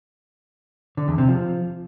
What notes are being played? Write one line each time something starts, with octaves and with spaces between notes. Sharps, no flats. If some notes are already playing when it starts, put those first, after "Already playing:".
D3
E2
C3
F3